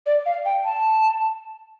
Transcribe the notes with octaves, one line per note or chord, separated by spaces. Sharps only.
D5
F5
G5
A5